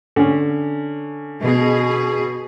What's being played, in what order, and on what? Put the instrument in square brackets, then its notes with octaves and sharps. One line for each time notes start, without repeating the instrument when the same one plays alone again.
[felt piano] D3 C#4
[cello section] B2 G#4